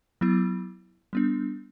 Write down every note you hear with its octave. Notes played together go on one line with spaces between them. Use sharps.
F#3 B3 E4
G3 B3 D4